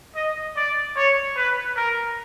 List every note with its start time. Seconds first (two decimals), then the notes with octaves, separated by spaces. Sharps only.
0.15 D#5
0.56 D5
0.96 C#5
1.37 B4
1.77 A#4